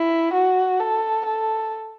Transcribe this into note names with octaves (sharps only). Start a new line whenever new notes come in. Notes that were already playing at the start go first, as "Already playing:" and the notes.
Already playing: E4
F#4
A4
A4